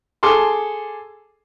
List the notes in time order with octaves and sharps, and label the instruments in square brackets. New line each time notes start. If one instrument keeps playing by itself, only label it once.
[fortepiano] G#4 A4 C6 D6